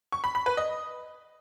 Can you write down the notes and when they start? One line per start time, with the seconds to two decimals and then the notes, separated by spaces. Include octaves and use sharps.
0.12 C#6
0.24 B5
0.35 B5
0.46 B4
0.57 D#5